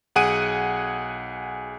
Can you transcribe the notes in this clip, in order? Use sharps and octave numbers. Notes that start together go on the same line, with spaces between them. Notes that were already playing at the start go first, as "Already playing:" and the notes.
B1 G#4 F#5 G#5 D7 D#7